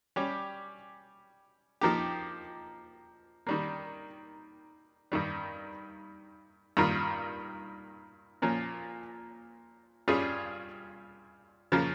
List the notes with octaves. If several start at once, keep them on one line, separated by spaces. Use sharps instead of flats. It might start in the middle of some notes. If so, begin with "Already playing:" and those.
G3 C#4 G4
F3 A#3 D#4 G4
D#3 G3 A#3
G2 D#3 G3
G2 D#3 A#3 F4
A#2 F3 A#3 C#4 F4
G2 G3 C#4 F4 G#4
C#3 F3 A#3 C#4 F4